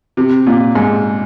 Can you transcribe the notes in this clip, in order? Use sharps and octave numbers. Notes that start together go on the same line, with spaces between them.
C3
A#2
G#2